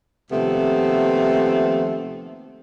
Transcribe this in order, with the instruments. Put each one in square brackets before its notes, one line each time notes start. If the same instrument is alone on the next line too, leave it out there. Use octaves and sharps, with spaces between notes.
[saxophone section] D#2 C3 F3 A3 B3 A4